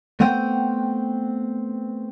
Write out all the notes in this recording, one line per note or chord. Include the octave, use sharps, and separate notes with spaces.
A3 B3 C4 F#5 G5